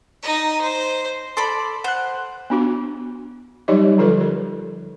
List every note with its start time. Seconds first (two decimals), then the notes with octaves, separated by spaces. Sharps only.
0.23 D#4 D#5
0.61 C5
1.37 A4 D5 B5 C6
1.84 C5 F#5 F#6
2.50 B3 D4 F#4
3.68 F#3 G3 D#4 G4 C#5 D#5
3.98 D3 F3 F4 A4 B4
4.20 A#4